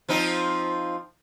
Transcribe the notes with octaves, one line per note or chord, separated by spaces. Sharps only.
F3 C4 D#4